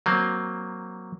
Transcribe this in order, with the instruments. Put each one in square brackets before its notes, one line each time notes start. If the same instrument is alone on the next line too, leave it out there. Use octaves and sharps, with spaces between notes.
[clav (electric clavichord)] F#3 A#3 C4